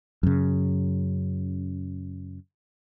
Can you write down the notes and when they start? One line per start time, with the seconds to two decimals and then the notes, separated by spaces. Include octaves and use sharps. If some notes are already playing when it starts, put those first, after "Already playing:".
0.23 F#2 C#3